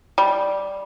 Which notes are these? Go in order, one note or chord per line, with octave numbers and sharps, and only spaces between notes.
G3